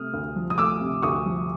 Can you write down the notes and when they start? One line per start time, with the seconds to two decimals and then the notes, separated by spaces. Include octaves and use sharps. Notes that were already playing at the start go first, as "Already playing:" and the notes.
Already playing: C3 A3 D#6 F6
0.14 D2
0.36 F3
0.50 D#6
0.58 A3 D6 E6
0.81 C3
1.02 D2 C#6 D#6
1.26 F3